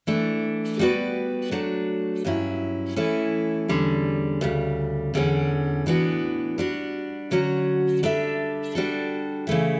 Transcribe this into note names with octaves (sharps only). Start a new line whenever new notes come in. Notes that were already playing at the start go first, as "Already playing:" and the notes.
E3 A3 D4
G3 B3 F#4 B4 D5
F#3 A3 D4 F#4
G2 F#3 C#4 E4
E3 A3 C#4 E4
E2 D3 G3 C#4
D2 C#3 G3
E2 D3 G3 C#4
A2 E3 B3 D4 F#4
G3 D4 F#4
D3 F#3 C#4 F#4
G3 D4 A4 E5
G3 D4 F#4 A4
C#3 E3 A3 E4